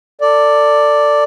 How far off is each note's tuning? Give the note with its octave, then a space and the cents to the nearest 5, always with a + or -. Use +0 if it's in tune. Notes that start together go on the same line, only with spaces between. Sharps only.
A4 +30 D5 +0